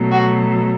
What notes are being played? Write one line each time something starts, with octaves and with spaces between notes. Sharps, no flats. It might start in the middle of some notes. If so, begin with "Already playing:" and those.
Already playing: B2 F#3 A3
F#4